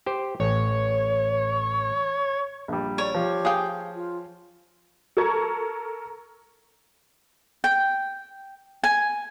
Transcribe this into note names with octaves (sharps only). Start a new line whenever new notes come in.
G4 C5
A1 C#5
A#1 G3
C#5 D5
F3 G4
G#4 F5 G5
F4
A4 A#4 C#6 G#6
G5
G#5